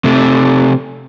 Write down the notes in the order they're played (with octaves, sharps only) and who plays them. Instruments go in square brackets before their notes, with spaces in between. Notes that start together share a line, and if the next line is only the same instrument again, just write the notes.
[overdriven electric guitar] C3 A3